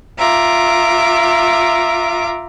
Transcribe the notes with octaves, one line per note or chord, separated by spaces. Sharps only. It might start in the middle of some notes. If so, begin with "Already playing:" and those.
F4 E5 A#5 D6